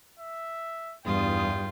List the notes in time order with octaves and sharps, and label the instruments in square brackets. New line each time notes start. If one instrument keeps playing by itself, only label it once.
[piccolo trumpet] E5
[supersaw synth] E2 D#6 [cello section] G2 [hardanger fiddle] F4 [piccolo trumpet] G5